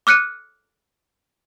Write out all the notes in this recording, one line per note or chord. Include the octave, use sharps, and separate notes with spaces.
D6 F6 F#6 C#7 D#7